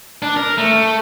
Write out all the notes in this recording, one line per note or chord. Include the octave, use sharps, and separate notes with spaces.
D4
A#4
A3